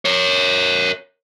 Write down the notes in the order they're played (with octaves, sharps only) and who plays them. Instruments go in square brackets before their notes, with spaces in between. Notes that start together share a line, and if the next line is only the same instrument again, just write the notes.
[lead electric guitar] A#4 C#5